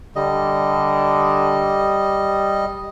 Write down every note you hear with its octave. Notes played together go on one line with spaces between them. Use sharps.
D3 G3 D#5